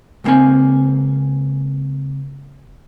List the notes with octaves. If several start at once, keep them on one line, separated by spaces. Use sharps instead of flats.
C#2 A#2 A#3 C4 G#5